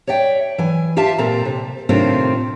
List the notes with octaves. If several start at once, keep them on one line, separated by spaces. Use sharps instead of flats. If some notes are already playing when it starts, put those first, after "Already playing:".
C#5 D5 E5 G5
E3 G#5
F4 G4 E5 F5 A5
A#2 C4 A4 A#5
C3
A2 C3 D#3 C4 D4 F4